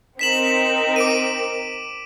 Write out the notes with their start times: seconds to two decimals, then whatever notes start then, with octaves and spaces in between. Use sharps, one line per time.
0.19 C4 D#4 A#4 B6 E7 F#7
0.96 D6 D7 D#7